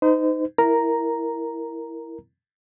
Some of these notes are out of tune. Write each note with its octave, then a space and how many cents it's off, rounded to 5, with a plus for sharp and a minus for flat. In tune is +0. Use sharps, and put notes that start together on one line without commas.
D#4 +0 C5 -40
E4 +0 A#4 +0 A#5 +0